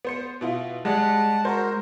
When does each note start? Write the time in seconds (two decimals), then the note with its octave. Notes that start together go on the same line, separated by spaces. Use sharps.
0.05 B3 C5 C#7
0.41 B2 E4 F4
0.85 G3 G#3 D5 F#5 A5
1.45 F#4 A#4 C5